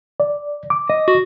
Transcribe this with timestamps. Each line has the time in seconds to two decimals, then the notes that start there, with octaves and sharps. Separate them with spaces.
0.20 D5
0.70 D6
0.90 D#5
1.08 F#4